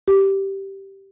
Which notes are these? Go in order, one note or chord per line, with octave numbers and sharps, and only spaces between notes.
G4